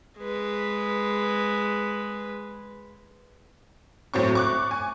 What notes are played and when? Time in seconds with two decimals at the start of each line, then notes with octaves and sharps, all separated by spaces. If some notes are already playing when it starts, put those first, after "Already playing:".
0.19 G#3 B4
4.14 A2 F#3 C4 C#6
4.35 C#6 D6 F#6
4.71 G#5